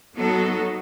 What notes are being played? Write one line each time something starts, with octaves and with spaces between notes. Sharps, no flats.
F#3 B3 D#4 F#4 A4